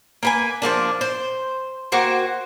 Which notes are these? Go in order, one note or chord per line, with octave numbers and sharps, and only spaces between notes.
A#3 B4 G#5
F3 G#3 A#3 D4
C5
A#3 F#4 C5 G5